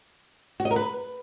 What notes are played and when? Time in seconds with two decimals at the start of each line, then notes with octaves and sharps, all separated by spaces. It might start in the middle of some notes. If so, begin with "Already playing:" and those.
0.60 F#4
0.65 D#5
0.71 A#4
0.76 B4